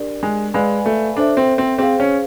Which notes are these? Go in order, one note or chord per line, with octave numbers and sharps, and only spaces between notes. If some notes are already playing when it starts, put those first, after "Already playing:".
Already playing: D4 G4 A#4 D5
G#3
G#3 B4 D5 F5 G#5 B5
A3
D4 A4 C5 E5
C4
C4
C4 G#4 C5 F5
C#4